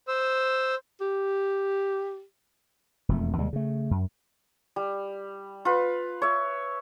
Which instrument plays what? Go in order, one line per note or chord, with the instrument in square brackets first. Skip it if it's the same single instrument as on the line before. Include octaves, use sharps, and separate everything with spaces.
[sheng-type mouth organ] C5 E6
[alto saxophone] G4
[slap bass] E1 F2 A3
D#2 C3 G3 G#3
C#3 A3
F#2
[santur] G3
F4 B4
C#5 E5